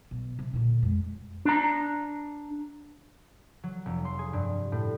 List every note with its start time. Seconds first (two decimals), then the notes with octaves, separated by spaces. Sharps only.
0.11 B2 F#3
0.39 C3
0.53 A#2 D3
0.83 F2 G#3
1.45 D4 A#5
3.63 F#3
3.86 F1
4.05 C6
4.19 G#4
4.33 G2
4.72 A2